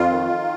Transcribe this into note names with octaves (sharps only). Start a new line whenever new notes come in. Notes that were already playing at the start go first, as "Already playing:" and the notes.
Already playing: F2 F4
D#3